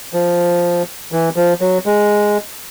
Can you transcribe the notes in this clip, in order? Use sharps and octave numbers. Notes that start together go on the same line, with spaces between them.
F3
E3
F3
F#3
G#3